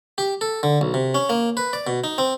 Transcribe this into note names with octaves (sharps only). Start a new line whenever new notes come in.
G4
A4
D3
B1
C3
C#4
A#3
B4
D5
B2
D#4
C4